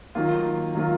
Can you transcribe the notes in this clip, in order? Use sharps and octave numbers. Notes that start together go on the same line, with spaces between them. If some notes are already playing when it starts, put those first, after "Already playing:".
D#3 F#3 A#3 F4
D#3 F#3 A#3 F4